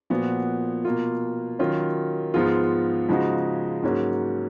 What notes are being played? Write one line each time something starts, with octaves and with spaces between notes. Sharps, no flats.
A#2 F3 B3 F#4
B2 A#3 F4
D#3 F#3 C#4 F4
G#2 F3 B3 F4 G#4
C#3 F3 G#3 D#4 F#4
G#2 F#3 A#3 C#4 F#4